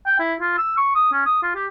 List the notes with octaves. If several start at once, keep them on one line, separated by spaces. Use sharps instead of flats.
G5
E4
F4
E6
C#6
D#6
C#4
D#6
F4
G4